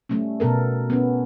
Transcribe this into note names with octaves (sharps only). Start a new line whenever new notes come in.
G3 A3 C#4
B2 B3 A4 A#4
B3 C#4